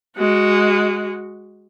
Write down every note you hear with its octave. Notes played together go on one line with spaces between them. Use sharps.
G#3 F#4